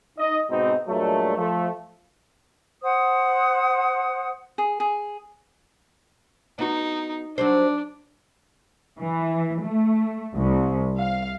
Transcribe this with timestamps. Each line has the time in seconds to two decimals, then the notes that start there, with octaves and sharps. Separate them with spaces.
0.18 D#4 D#5
0.50 G#2 B2 C4 D#4
0.88 G2 A#2 F#3 G#3 A3
1.37 F3 A3
2.83 C5 F#5 D#6
4.58 G#4
4.80 G#4
6.59 B3 D#4 F#4
7.38 F#3 G3 D4 C5
8.99 E3
9.64 A3
10.36 C2
10.99 F5